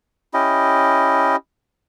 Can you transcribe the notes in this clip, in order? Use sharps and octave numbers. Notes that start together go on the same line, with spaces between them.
C#4 E4 G4 D#5